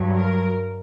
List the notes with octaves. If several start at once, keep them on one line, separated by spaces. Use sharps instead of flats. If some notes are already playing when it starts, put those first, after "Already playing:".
Already playing: G2 F#3
A#4